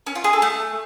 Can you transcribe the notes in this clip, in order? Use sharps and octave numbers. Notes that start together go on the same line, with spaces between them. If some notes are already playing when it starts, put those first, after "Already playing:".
C#4
F4
G#4
A4
A3